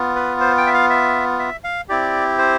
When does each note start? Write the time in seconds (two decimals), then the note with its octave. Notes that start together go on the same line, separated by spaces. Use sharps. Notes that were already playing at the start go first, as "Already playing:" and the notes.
Already playing: B3 F4
0.16 B4
0.40 C5
0.58 G5
0.67 E5
0.74 F5
0.90 E5
1.39 E5
1.64 F5
1.88 C4 E4 G4 D5
2.38 C5